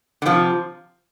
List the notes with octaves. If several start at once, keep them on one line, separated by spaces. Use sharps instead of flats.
D3
C3 F3